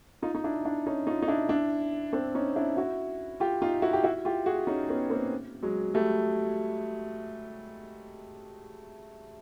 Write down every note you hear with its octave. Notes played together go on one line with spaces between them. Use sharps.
D#4 F4
D#4
D4 E4
D4 E4
C#4 D#4
D#4 F4
D#4
D4 E4
D4 E4
C4 D4
C#4 D#4
D4 E4
E4 F#4
F4 G4
D#4 F4
E4 F#4
G4
E4 F#4
F4 G4
F#4 G#4
C#4 D#4
B3 C#4
A#3 C4
F#3 G#3
G3 A3